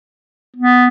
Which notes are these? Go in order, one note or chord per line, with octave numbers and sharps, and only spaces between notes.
B3